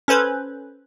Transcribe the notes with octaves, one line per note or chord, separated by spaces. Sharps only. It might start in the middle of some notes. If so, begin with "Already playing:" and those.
C#4 A4 B4 C5